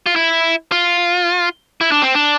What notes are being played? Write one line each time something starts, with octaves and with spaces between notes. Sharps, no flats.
F4
E4
F4
E4
D4
C4
D4